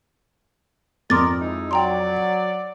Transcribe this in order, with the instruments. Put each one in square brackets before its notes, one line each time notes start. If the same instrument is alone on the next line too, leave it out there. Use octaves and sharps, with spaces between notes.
[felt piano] F2 [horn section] A#4 D5 D#5 [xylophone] C6 D6 A6
[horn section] G#3 D#4 E4
[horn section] F#3 D5 [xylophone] G5 A#5 C6